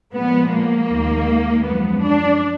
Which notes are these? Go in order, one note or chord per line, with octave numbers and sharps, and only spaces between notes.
A#2 F3 G#3 B3
A#3
D#2 D#3 G#3
F#2 F3 G#3 B3
D4